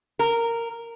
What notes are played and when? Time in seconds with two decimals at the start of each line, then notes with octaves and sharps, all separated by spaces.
0.19 A#4